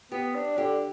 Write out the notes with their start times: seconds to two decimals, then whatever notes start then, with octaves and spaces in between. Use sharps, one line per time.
0.11 B3 G4
0.35 D4
0.57 D3 G4